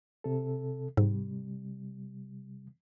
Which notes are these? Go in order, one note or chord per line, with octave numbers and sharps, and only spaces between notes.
C3 A4
G#2 C3 G3